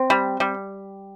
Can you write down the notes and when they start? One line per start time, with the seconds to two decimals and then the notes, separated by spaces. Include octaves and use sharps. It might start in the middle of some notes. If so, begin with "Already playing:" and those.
Already playing: C4
0.10 G3
0.40 G3